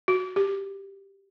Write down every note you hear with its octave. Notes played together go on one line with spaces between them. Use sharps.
F#4
G4